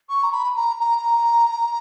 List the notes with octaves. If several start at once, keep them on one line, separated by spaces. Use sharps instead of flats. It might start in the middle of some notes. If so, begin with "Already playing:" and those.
C#6
A#5
B5
A#5
A#5